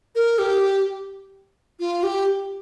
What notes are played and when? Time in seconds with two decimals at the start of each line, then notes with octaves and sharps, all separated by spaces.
0.15 A#4
0.39 G4
1.80 F4
2.03 G4